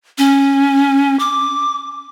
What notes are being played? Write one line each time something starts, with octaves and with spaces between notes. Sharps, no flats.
C#4
D6